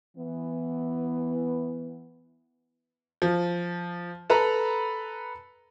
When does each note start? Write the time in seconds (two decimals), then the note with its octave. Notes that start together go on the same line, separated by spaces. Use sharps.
0.17 E3 B3
3.22 F3
4.30 A4 B4 A#5 B5